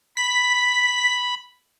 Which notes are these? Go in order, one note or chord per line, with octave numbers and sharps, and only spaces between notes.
B5 B6